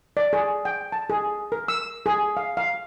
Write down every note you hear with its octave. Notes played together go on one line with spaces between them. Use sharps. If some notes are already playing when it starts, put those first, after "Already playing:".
D5
G#4
G5
A5
G#4
A#4
E6
G#4
F5
F5